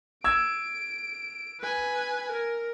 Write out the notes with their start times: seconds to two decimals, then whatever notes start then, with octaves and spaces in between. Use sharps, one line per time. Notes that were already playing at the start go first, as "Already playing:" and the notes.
0.24 E6 G#6 D7
1.61 B4 G#5
2.32 A#4